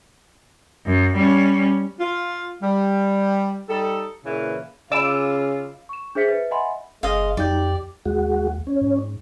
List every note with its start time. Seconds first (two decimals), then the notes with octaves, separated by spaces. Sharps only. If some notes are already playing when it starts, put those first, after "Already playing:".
0.86 F#2
1.17 G3 C#4
2.00 F4
2.62 G3
3.69 G3 D#4 A4
4.25 A#2 C#3 E3
4.92 C#3 F4 D#5 G#5 B5 D6 E6
5.89 C#6 E7
6.15 D4 G#4 C5 E5 B6 C#7
6.29 B4 E5
6.51 D#5 E5 F#5 G#5 B5 C6
7.03 F#1 G#3 D#5 F5
7.37 F2 F#3 D#4 G4 D5 G6
8.05 D#2 G#3 F#4
8.67 C#4
8.81 G#2